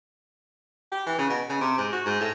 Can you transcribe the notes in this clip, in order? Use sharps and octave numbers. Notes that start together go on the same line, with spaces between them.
G4
E3
C#3
B2
C#3
C3
G#2
F#4
G#2
A2